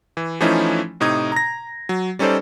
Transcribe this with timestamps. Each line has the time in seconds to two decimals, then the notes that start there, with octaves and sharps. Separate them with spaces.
0.17 E3
0.40 E3 F3 A3 C#4 D#4 E4
1.00 A2 C3 D#4 D#6 G#6
1.32 A#5 A#6
1.89 F#3
2.19 G3 C#4 D#4 A4 C5 D5